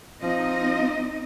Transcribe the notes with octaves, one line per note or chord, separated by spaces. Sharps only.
F3 C4 D#4 D#5